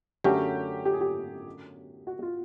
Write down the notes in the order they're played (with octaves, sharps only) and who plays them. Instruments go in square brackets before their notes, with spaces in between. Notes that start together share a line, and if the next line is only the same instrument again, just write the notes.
[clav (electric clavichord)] F#2 D3 F#3 A3 C#4 [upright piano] G4
[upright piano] G4
G#4
G4
F#4
F4